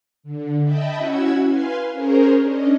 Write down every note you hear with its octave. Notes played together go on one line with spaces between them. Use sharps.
D3
D#5 E5 G5 A5 B5
C#4 E4 F#4 F#5 E6 G#6
B4 F5 G#5 C6
C#4 G#4 A#4 C5 C#5
C#4 D4 D#5